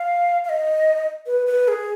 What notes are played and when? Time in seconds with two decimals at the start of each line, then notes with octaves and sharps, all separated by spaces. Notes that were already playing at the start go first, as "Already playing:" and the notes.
Already playing: F5
0.44 F5
0.49 D#5
1.26 B4
1.47 B4
1.68 G#4